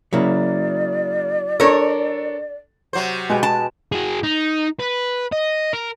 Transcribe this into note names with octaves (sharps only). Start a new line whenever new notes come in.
C#3 F#3 A#3 E4 D5
D4 A4 A#4 C#5
C3 F#3 C5
B2 G#3 G4 B4
A5
F#4 G#4
D#4
B4
D#5
A#4